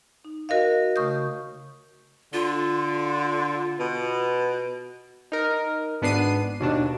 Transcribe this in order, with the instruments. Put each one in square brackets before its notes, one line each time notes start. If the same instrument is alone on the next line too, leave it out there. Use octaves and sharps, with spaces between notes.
[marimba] D#4
F#4 A#4 D#5 F5
C#3 A3 C#6 D#6 G6
[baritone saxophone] D3 [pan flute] F4
[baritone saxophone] B2
[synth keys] D#4 A#4
G#1 B3 D4 C7 D#7
D#2 B2 D4